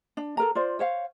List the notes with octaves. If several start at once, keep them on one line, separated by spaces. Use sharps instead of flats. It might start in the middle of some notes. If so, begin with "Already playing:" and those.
D4
A4 A#4 A#5
F4 C5 D5
C5 C#5 F5